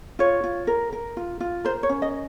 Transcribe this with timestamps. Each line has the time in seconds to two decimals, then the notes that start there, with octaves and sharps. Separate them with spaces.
0.19 F4 C#5
0.44 F4
0.67 A#4
0.93 A#4
1.17 F4
1.40 F4
1.65 A#4 C5
1.83 C#5
1.89 C#4
2.02 D#5